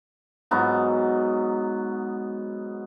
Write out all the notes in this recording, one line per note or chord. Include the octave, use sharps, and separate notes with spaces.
G#2 F#3 B3 A#5